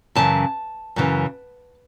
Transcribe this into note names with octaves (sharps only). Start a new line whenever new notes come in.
F#2 C#3 E3 A5
F#2 C#3 E3